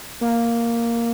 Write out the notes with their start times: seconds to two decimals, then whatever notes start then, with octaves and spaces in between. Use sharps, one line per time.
0.21 A#3